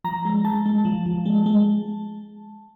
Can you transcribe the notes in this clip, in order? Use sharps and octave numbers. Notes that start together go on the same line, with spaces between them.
F3 A#5
G#3
G#3 A5
G#3
F3
F3
G#3
G#3